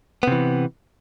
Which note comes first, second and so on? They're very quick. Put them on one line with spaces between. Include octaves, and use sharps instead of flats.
B3 C3 E3